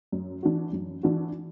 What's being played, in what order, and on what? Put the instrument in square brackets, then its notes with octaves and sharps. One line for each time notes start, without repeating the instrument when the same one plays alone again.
[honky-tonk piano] F#2
E3 D4 F#4
F#2
E3 D4 F#4